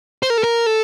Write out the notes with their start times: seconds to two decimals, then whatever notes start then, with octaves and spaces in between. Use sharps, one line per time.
0.23 C5
0.30 A#4
0.38 A4
0.44 A#4
0.66 A4